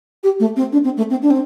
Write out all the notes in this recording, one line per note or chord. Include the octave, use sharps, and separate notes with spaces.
G4
A3
C4
D4
C4
A3
C4
D4
C4